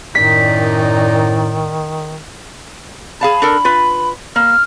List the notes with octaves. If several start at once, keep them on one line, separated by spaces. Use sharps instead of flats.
F#2 A2 D#3 D#4 D5 B6
G#4 F5 A5 B5
D4 A4 A#4
F4 B4
A#3 F6